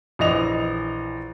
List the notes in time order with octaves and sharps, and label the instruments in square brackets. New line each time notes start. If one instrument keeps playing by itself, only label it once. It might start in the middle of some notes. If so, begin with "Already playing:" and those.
[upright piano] A#1 E3 D#5 F7